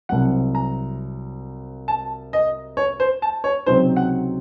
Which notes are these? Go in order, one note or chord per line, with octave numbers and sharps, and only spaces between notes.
C2 C3 F#3 F#5
A#5
A5
D#5
C#5
C5
A5
C#5
C#2 C3 F#3 C4 D#4 C5
F#5